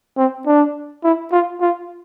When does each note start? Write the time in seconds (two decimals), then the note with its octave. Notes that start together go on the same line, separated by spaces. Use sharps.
0.17 C4
0.46 D4
1.04 E4
1.32 F4
1.61 F4